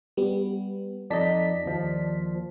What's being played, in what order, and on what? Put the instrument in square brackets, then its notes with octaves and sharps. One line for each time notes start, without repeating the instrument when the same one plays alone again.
[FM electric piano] G3 B3
[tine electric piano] F2 D#4 D#5 [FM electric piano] D5 A5 B6
[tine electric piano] D#2 F3